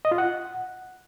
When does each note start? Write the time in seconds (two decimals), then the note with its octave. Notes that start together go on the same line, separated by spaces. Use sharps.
0.05 D#5
0.11 F4
0.18 F#5